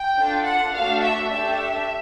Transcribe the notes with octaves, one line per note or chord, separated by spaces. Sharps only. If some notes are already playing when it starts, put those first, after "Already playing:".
Already playing: G5
D4 F4 A4
F#5
A3 D4 F#4 A4 F5
E5
A3 D4 G4 E5